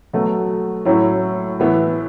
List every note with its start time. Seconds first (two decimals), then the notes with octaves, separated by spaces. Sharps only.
0.13 B2 F#3 A3
0.85 A2 F#3 C#4 E4
1.60 A2 E3 B3 E4